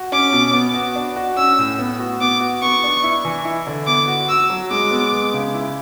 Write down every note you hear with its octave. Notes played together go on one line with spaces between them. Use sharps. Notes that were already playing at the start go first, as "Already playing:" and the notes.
Already playing: F#4
C#4 D6
B2
B3
F#4
D4
F#4
C#4 E6
A2
B3
F#4
B3 D6
F#4
B3 C#6
D4
E4
E3
E4
D3
B3 D6
F#4
F#4 E6
F#3
G#3 D6
B3
G#3
C#3
E4